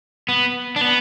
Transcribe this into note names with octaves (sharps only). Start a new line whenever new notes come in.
B3
D4
B3